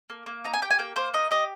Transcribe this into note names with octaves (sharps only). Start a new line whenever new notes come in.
A#3
A#3
D#4 A#5
G#5
G4 G5
G#5
A#3 G5
A#3 C5
D#4 D#5
G4 D#5